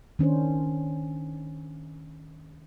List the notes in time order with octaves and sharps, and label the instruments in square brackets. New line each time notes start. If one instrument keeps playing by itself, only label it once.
[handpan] D#3 C#4 D4 C5